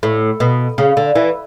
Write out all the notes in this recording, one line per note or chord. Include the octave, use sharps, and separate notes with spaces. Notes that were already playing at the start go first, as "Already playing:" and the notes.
A2
B2
C#3
D3
E3